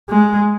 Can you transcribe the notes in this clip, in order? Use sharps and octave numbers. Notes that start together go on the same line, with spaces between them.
G#3